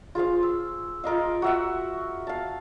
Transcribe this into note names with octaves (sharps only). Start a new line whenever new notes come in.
F4 G#4 C5 F5
E6
F4 A#4 D#5 F5
F#4 E5 F#5
F5 A5